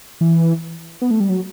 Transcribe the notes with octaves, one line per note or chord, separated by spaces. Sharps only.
E3
B3
A3
G3
F#3